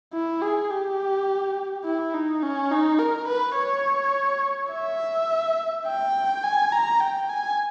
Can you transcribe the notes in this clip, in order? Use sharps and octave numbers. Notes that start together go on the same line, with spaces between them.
E4
G#4
G4
E4
D#4
C#4
D#4
A#4
B4
C#5
E5
G5
G#5
A#5
G5
G#5